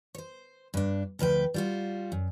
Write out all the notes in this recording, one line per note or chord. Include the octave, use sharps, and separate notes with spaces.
C5 C#5
G2 D4
D2 F3 B4 G5
G3 F4 F#4
F#2